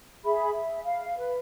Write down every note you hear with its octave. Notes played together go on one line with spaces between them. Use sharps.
G#4 E5 B5
E5
F5
B4